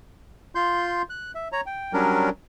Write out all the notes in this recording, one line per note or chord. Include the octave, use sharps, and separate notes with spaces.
F4 C6 G6
F#6
E5
C#5 A#5
G5
F#3 G3 C#4 D4 A#4